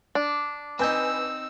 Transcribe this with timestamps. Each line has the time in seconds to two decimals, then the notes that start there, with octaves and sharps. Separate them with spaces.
0.15 D4
0.79 C4 D#4 B4 G#5 E6 G6